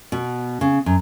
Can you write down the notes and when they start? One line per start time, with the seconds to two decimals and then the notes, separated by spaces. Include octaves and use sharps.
0.12 B2
0.61 C#3
0.86 F#2